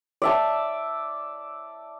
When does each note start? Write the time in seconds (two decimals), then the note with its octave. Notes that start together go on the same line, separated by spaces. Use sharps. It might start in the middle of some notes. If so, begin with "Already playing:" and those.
0.22 D5 E5 A5